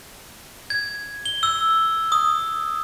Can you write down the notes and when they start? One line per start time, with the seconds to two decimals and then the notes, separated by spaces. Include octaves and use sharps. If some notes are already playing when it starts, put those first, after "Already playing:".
0.70 G#6
1.26 G7
1.43 E6
2.12 D#6